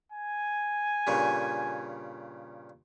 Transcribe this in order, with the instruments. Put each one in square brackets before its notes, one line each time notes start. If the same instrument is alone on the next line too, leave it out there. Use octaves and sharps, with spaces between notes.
[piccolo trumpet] G#5
[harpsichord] G2 A#2 C#3